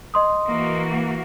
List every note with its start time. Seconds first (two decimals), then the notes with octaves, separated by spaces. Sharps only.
0.14 D#5 C6 D#6
0.48 E3 A#3 F#4